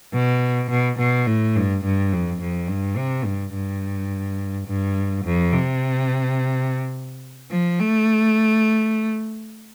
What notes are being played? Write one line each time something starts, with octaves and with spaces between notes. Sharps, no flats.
B2
B2
B2
A2
G2
G2
F2
F2
G2
C3
G2
G2
G2
F2
C3
F3
A3